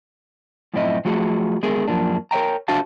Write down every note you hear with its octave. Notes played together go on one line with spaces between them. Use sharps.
F#2 A2 F3 C4 E4 D#5
F3 F#3 A3 F4 F#4 G#4
D3 G#3 B3 G#4 A#4
F#2 F3 A#3 D4
A#4 C#5 E5 G5 A#5
D4 F#4 C5 F5 A5